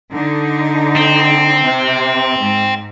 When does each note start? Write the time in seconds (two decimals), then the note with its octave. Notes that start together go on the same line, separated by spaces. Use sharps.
0.13 D3 D#4
0.96 C4
1.63 C3
2.39 G#2